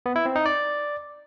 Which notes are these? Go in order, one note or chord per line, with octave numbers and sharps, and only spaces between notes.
B3
E4
C4
D#4
D5